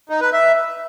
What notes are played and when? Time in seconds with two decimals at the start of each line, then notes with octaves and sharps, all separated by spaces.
0.10 D#4
0.21 B4
0.33 E5